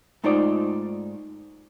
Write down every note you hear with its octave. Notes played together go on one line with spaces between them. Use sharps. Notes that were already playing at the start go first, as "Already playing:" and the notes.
G#2 A3 D#4 F4 C5 D5